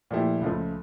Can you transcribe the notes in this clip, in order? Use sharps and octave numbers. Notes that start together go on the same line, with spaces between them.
A#2 F3 A3 E4 G4
C#2 C#3 F3 A3